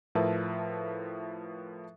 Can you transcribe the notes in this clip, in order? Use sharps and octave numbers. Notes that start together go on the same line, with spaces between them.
A2 F3 A#4 B4 E5 A5